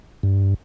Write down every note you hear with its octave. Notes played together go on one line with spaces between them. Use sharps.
G2